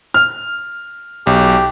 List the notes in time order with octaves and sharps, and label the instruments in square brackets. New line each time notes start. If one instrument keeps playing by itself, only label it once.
[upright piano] F6
[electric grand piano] B1 [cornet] G4